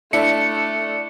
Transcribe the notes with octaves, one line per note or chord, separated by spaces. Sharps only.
A3 D4 E4 C#7